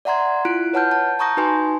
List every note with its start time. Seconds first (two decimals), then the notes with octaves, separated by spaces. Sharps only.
0.05 D5 E5 F#5 A#5 C6 G#6
0.45 E4 F4 F#6 D7
0.73 B4 C#5 F#5 A5 F6 G6
0.91 A5
1.19 A5 A#5 C#6 D#6 G6 A#6
1.37 D#4 F#4 B4 G#5 C6